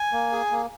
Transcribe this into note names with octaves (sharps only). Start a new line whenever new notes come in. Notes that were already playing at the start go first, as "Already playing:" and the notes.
Already playing: G#5
A#3
G#4
A#3